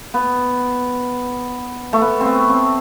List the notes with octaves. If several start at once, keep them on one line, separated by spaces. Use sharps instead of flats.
B3
A3
B3
B3 C4
C4